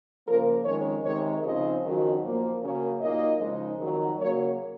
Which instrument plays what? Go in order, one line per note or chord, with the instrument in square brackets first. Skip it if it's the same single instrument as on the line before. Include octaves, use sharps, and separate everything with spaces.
[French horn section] C#3 F3 A#3 A#4
F2 D#3 G#3 C#4 C#5
C3 D#3 G#3 C#5
C#3 F3 C4 D#4 D#5
F2 D#3 F#3 C#4
A#2 F3 A#3
C#3 F#3 A#3 C#4 C#5
A#2 F#3 A#3 D#4 D#5
C#3 F3 G#3 D#4
F2 D#3 F#3
C#3 F#3 A#3 C#5